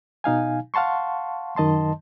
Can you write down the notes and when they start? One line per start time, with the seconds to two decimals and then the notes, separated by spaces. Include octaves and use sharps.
0.24 B2 D#4 F5 G#5
0.74 F5 F#5 A5 C6 C#6
1.56 F#2 D#3 D#5 A5 C6